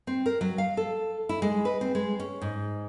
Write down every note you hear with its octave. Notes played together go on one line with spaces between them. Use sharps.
C4
A#4
F#3
F5
A4
E4
G#3
B4
C4
G#3
C#4
G#2